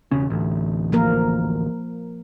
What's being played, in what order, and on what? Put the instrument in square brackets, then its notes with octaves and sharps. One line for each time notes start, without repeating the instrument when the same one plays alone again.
[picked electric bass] E1 C#3 C#4
A1 D2
[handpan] F3 A#3 A#4